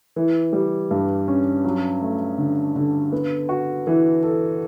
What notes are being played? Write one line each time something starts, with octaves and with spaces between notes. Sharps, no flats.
E3
G3
G2
C#4
F#3
A3
D3
D3
B3
F#4
E3
A4